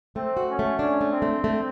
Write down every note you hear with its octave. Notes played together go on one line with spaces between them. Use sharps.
A3 C4
F#4
C#4
A3
C#4 D4
A3
C4
A3
A3